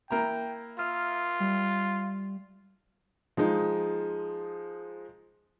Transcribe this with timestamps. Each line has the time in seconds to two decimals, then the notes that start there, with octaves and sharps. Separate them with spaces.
0.10 A#3 E4 G5 A#5
0.79 F4 E5 D#6 F6
1.40 G3
3.37 F3 G#3 D#4